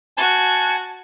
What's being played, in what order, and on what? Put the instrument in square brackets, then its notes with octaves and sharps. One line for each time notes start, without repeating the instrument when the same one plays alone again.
[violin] F#4 [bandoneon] G#5 A5